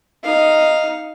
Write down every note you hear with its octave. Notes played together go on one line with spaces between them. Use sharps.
D#4 F5